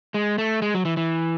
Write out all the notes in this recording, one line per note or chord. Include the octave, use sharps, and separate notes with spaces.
G#3
A3
G#3
F#3
E3
E3